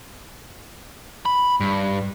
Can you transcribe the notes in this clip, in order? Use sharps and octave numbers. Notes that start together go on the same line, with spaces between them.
B5
G2